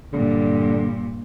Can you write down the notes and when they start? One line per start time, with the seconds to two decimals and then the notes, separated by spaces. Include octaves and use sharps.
0.13 G2 A#2 D3